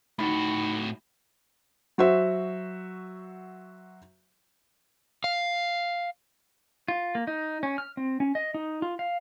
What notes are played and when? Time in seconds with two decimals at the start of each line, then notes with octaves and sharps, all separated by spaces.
0.19 A2 D#4 F#4 B5
1.98 F#3 F#4 C5 E5
5.24 F5
6.88 F4
7.15 A#3
7.27 D#4
7.63 C#4
7.78 F6
7.97 C4
8.20 C#4
8.35 D#5
8.54 D#4
8.82 F4
8.99 F5